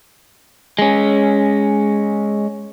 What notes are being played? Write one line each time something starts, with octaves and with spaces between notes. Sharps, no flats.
G#3 C#4